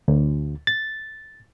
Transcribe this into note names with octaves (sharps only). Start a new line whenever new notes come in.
D2
A6